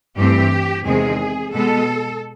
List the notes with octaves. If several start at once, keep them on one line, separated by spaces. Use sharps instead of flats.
G2 E3 A3 C4 G4
E2 C3 D#3 G#3 C4 G#4
B2 G#3 B3 A4